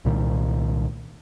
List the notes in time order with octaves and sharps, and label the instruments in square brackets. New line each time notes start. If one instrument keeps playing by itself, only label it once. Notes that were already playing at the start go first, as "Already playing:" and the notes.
[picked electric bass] C2 A#2 D#3